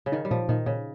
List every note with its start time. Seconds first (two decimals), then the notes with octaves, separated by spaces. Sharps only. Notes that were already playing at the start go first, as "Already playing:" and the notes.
0.06 C#3
0.12 D#3 D#4
0.25 G3
0.31 A#2 F3
0.49 A#2 D#3
0.66 A#2 C#3